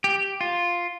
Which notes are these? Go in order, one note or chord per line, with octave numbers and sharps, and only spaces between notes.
G4
F4